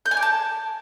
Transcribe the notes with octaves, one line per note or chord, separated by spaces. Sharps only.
G6
G#5
D6
A5